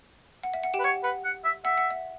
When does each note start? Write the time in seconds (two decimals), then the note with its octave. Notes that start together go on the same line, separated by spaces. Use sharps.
0.43 F#5
0.54 E5
0.63 F#5
0.74 G4 G5
0.79 B4
0.84 C#5 F#5
1.04 B4 F#5
1.25 F#5
1.44 E5
1.65 E5 F#5
1.78 F#5
1.91 E5